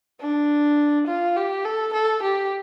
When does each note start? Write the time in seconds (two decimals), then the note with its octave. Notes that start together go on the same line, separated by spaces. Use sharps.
0.20 D4
1.07 F4
1.36 G4
1.65 A4
1.94 A4
2.23 G4